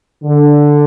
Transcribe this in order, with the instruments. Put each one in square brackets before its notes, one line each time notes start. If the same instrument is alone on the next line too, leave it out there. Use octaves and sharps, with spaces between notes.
[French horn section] D3